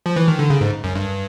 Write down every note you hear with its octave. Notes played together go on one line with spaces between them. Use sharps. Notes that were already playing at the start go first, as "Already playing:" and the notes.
F3
E3
D#3
D3
C#3
G#2
F#2
G2